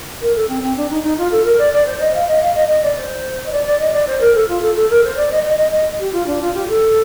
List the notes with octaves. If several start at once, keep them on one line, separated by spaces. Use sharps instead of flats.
A#4
A4
C4
C4
D4
D#4
D#4
F4
A4
A#4
D5
D5
C5
D#5
F5
D#5
F5
D#5
D#5
D5
C5
D#5
D5
D5
D#5
D5
C5
A#4
A4
F4
A4
A4
A#4
C5
D5
D#5
D#5
D#5
D#5
G4
F4
D4
F4
G4
A4